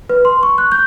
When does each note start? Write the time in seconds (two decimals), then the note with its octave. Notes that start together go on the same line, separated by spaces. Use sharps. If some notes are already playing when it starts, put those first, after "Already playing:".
0.10 B4
0.25 C6
0.43 C#6
0.58 F#6
0.72 G6